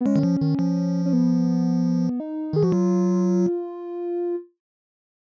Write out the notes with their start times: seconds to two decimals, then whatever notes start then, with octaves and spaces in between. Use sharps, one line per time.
0.01 B3
0.06 G#3 C#4
0.16 D#3
0.23 F3
0.41 D#3
0.59 F3
1.06 C#4
1.13 B3
2.20 D#4
2.53 D#3 G#4
2.63 F3 F#4
2.72 F#3 F4